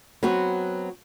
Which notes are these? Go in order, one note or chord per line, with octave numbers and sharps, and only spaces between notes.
F#3 B3 C4 F#4